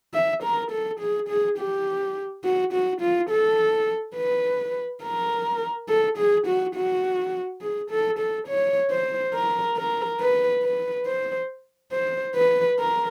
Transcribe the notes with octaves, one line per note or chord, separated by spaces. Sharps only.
E5
A#4
A4
G#4
G#4
G4
F#4
F#4
F4
A4
B4
A#4
A4
G#4
F#4
F#4
G#4
A4
A4
C#5
C5
A#4
A#4
B4
B4
C5
C5
B4
A#4